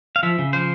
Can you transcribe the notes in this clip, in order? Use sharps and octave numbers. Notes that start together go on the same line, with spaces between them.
F5
F3 E5
C#3
F3 C5